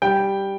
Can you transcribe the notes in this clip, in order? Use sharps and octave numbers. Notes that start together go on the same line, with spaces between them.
G3 G5